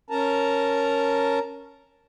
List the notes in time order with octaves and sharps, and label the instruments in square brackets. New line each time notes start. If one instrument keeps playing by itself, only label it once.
[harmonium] C#4 A#4 A5 A#5